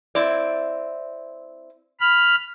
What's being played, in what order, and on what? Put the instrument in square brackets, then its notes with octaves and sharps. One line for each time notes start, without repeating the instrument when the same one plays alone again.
[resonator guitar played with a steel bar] C4 E4 D5
[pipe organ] B5 F6